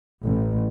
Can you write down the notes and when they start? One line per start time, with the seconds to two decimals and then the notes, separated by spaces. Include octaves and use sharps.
0.24 A1